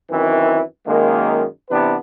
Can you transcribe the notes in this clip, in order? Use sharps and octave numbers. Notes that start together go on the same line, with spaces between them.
F#2 D#3 E3 C4 E4
F#2 D#3 G#3 A#3
C3 E3 B3 D4 B4